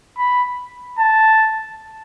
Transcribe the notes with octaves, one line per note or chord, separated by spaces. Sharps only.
B5
A5